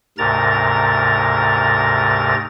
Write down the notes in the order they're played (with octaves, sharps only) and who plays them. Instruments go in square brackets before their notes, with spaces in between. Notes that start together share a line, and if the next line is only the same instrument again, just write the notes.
[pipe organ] D2 G#2 C3 A#4 A#5 A6